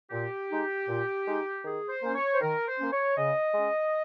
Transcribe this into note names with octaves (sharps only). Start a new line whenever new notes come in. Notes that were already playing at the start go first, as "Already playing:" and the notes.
A#2 G4
G#3 D#4
A#2
G#3 D#4
D#3 G#4
C5
A#3 C#4
C#5
C5
D#3 A#4
C5
A#3 C#4
C#5
C#3 D#5
G#3 C#4